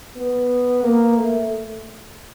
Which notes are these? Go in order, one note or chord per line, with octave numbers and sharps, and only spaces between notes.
B3
A#3
A3